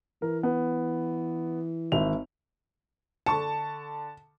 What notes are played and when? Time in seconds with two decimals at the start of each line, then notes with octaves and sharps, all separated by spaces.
0.22 E3 A#4
0.43 B3
1.92 G#1 E5 F7
3.26 D3 A5 C#6 C#7